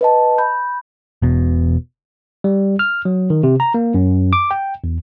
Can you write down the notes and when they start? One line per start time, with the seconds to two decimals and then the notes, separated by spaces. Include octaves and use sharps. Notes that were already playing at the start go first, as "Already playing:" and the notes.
0.01 B4 D#5 A5
0.38 B5 G6
1.22 E1 B2
2.44 G3
2.79 F6
3.05 F#3
3.30 D#3
3.43 C3
3.60 A#5
3.74 A#3
3.94 F#2
4.33 D6
4.51 G5
4.84 E2